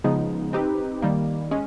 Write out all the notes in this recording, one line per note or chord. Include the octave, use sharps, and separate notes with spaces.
C#3 F3 G#3 B3 D#4
C4 D#4 G4 B4
D#3 G3 A#3
G#3 C#4